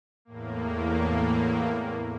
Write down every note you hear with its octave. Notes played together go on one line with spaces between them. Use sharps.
E2 A2 A#3